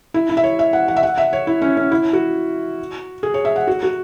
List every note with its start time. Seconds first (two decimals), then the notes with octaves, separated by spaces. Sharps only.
0.14 E4
0.29 E4
0.37 E5
0.44 C#5
0.59 E5
0.73 F#5
0.88 F#5
0.96 E5
1.03 F#5
1.18 E5
1.33 C#5
1.47 E4
1.62 C#4
1.77 C#4
1.92 E4
2.13 F#4
3.23 G#4
3.34 C#5
3.45 E5
3.56 F#5
3.67 F#4
3.83 F#4